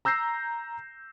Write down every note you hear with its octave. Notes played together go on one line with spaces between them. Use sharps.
A#5 E6 G6 A#6 C7